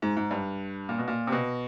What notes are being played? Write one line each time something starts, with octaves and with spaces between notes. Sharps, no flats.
G#2
G#2
G2
A#2
B2
A#2
C3
B2